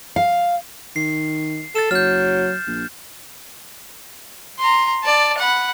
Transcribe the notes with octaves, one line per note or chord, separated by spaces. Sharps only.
F5
D#3 C7
A4 A6 E7
F#1 F#3 F6 G6
A#1
A#5 C6
D5 A5
F#5 B5